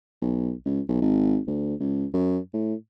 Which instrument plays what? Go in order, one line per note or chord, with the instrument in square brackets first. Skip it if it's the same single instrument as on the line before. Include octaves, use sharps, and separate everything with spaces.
[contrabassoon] B1
C#2
B1
G#1
D2
C#2
F#2
A2